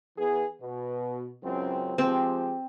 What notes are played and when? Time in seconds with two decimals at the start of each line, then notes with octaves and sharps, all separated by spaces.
0.18 E3 B3 G#4
0.61 B2
1.43 C#2 F#2 C4
1.98 F3 G#3 C4 G4